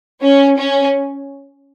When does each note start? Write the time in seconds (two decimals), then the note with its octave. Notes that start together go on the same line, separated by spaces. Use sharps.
0.22 C#4
0.58 C#4